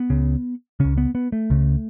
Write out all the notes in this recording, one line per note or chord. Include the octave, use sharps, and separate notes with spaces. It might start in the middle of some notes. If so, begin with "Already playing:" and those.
Already playing: B3
C#2 C#3
C#2 C#3 C#4
B3
B3
A3
C#2 C#3